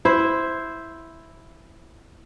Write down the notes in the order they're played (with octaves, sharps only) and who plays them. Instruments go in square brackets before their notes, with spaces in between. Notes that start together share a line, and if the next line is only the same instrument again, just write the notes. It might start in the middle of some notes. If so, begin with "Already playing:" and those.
[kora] E4 C5